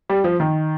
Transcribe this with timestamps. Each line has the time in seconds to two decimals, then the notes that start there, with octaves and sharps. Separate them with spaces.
0.10 G3
0.24 F3
0.40 D#3